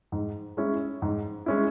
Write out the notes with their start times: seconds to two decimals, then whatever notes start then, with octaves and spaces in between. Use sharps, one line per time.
0.12 G#2
0.57 G#3 C#4 E4
1.02 G#2
1.46 G#3 C#4 E4